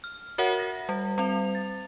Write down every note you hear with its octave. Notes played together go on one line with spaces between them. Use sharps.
F6
F#4 A#4 C#5 E5 F#5
A#6
G3
G3 C4 F7
A6